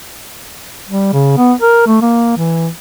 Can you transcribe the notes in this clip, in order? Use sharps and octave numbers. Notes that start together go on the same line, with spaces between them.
G3
C#3
B3
A#4
A3
A#3
E3